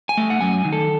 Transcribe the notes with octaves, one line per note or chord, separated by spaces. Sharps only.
G#5
A3
F#5
F#2 G#5
D#3
A4